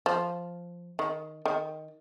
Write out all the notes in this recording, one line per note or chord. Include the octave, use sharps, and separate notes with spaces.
F3
D#3
D#3